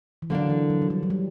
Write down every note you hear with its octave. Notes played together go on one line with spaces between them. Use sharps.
E3
D3 F#3 A#3 D4
E3
F#3
F#3
G3
F#3
G3